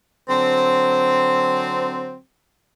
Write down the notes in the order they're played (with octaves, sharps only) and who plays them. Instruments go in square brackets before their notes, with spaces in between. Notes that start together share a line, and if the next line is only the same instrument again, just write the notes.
[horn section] D3 F#3 C4